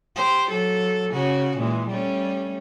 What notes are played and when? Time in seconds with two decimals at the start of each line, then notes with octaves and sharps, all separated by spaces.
0.16 G4 C5
0.50 F#3 A4
1.10 C#3 C#4 F#4
1.57 A#2 E3 G#3
1.88 G3 A3 C#4